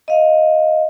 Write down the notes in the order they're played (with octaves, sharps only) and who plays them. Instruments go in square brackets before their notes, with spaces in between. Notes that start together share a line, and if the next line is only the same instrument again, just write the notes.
[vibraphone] D#5 F5